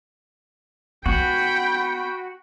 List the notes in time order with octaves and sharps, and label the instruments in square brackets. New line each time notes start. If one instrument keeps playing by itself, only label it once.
[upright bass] B3 [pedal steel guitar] F#4 [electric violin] G5 B5